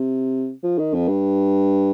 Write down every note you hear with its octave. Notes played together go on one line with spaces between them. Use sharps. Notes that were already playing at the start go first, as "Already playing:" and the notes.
Already playing: C3
F3
D#3
F2
G2